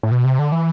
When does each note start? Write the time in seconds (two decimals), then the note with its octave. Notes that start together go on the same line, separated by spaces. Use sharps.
0.03 A2
0.11 B2
0.25 C3
0.39 D3
0.52 E3